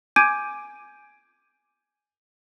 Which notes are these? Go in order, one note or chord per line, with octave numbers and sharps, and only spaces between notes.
G#5 D6 G6 G#6 D7 D#7